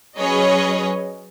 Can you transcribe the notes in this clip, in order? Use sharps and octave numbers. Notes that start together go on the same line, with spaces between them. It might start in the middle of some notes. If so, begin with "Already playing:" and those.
F#3 C#4 G#4 B4 C#5 D#5